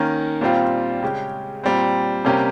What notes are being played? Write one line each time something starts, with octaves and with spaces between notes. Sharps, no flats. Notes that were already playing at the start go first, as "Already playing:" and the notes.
Already playing: D#3 A#3 C#4
A#2 G3 C4 F4
C#3 G#3 C#4 G4
A#2 G3 C4
C3 G3 A#3 C#4 G4